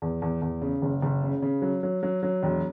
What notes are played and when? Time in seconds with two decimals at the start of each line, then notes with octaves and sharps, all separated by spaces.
0.02 E2
0.22 E2
0.42 E2
0.62 C#3
0.82 F#1
1.02 F#1
1.22 C#3
1.42 C#3
1.62 F#3
1.83 F#3
2.03 F#3
2.23 F#3
2.43 E1